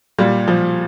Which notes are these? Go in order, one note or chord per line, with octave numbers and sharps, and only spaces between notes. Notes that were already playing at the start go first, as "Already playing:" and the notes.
A#2 G3
F3